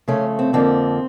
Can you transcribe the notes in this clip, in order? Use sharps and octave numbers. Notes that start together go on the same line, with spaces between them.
C#3 F3 A3 C#4
C4
F2 D3 F3 A#3 C4